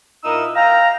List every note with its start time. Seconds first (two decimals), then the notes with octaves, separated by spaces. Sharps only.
0.24 A#2 D#4 E4 A#4 D#6 E6
0.55 F5 G5 A#5